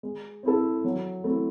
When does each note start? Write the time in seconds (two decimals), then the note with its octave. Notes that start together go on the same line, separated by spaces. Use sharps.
0.03 G#3
0.43 C4 E4 A4
0.85 F#3
1.24 A3 C4 E4